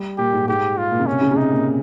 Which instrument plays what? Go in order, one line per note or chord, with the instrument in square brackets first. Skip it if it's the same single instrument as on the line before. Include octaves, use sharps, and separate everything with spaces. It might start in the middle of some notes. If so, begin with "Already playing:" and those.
Already playing: [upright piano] G3
[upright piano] A#2 [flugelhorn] G4
[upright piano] G#2
[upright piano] G#2 [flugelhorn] G4
[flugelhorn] F4
[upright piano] A#2
C#3
[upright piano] C3 [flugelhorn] C#4
[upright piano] C#3
C#3
[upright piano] C3 [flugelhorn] D#4
[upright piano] A#2